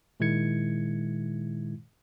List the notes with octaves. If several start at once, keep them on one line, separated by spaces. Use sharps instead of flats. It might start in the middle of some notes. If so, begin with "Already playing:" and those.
A#2 D#3 G#3 E4 G#6 C#7